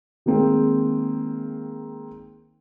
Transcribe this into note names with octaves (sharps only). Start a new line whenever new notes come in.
D#3 G#3 A#3 C4 G#4